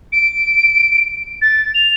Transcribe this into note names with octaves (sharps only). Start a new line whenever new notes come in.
D7
A6
F7